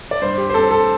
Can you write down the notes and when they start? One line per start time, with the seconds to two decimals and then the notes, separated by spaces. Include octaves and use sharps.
0.11 D5
0.22 G2 C5
0.38 G4
0.50 C5
0.54 C4 A4
0.71 A4